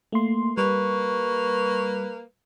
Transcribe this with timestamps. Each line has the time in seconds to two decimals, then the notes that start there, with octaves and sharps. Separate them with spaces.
0.12 A3 A#3 C6
0.57 G3 A#3 B4 C#6